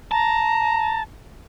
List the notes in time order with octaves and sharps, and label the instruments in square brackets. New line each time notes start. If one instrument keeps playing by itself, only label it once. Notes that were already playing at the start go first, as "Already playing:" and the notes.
[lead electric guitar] A5 [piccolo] A#5